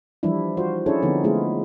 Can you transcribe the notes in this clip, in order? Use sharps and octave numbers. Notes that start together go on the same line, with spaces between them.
E3 F3 G3 D4 E4
F4 F#4 C5
C#4 D4 E4 G#4 A4 C#5
D3 F3 B3 C4 D#4
G#3 A3 B3 E4 F4 G#4